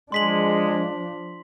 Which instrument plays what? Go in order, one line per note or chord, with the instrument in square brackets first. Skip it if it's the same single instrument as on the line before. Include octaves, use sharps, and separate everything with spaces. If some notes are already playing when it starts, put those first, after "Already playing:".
[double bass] F3 D4 [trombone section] G#3 [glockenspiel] C6 B6 F#7